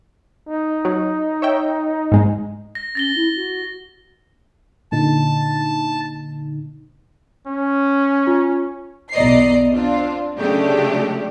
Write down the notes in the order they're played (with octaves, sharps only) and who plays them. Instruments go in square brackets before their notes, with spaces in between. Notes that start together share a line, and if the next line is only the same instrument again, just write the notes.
[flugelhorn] D#4
[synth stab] F#3
C#5 E5 G5
G#2 G#3
[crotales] A#6
[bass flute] C#4 [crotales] A6 A#6 G7
[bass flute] E4
F#4
[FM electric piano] A#2 D3 D#4 [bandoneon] A5
[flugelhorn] C#4
[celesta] F4
[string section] B1 E2 D5 D#5 A#5 C7
C4 D4 F4
C#3 F#3 G#3 A3 D4 G4